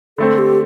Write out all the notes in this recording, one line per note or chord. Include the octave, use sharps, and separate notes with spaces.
D3 A3 C4 A4
G4